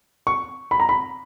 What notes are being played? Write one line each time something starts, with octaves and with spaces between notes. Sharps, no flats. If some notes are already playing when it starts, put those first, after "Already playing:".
C#6
B5
A#5
B5